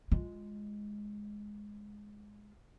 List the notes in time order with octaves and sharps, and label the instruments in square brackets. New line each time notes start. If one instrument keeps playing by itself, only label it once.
[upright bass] G#3 F4